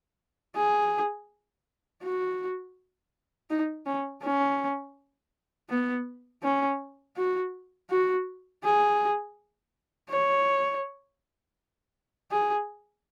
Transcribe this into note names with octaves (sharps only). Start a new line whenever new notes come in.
G#4
F#4
D#4
C#4
C#4
B3
C#4
F#4
F#4
G#4
C#5
G#4